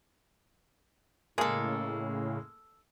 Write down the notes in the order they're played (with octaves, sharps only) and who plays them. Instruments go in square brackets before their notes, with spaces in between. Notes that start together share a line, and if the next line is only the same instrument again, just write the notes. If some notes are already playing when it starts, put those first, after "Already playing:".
[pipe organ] A2 C#3 [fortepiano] G#3 A#3 [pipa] G#4 A4